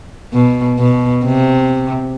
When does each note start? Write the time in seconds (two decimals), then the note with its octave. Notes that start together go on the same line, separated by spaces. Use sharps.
0.33 B2
0.78 B2
1.25 C3